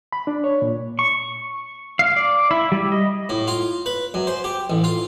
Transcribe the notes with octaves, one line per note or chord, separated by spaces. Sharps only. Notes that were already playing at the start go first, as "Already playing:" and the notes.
B5
D4
C#5
A#2
C#6
F5
D5
E4
G3
D#5
A2
F4
B4
F#2
C5
G4
A1
F4